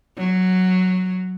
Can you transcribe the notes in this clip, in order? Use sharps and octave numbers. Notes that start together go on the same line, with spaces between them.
F#3